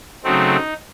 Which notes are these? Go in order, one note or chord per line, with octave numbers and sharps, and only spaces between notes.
C#3 F#3 A3 C4 D#4